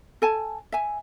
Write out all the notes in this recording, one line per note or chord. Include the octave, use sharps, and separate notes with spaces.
A4 G#5 A5
E5 G#5